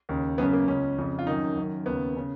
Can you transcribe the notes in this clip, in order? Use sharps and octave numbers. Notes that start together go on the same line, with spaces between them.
D#2 C#3
F#2 C#3 B3
A#3
C#2 C#3 C#4
F2 C#3
F4
F#2 D#3 D#4
F#2 D#3
D#2 C#3 B3
C#3